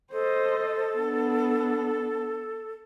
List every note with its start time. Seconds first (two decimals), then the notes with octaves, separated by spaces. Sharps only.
0.12 A4 C5 D#5
0.95 B3 D4